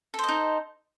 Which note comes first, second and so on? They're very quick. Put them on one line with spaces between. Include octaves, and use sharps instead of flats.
A4 C5 D#5 D#4